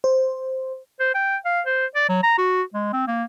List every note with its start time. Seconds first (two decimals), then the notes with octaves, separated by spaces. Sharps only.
0.04 C5
1.00 C5
1.15 G5
1.45 F5
1.66 C5
1.95 D5
2.09 F#3
2.23 A#5
2.38 F#4
2.74 G#3
2.93 C4
3.07 A#3